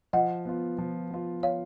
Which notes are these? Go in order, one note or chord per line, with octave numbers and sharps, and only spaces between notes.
F3 D#5 F#5
B3 F4
F3
B3 F4
C#5 F5